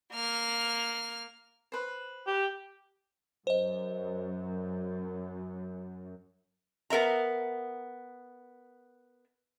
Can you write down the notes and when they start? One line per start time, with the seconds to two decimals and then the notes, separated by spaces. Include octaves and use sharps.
0.13 A#3 F6
1.72 B4 C5
2.27 G4
3.47 F#2 C5 D#5
6.90 B3 A#4 E5 A#5